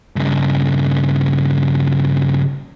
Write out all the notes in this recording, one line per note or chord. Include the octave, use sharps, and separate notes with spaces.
G2 C#3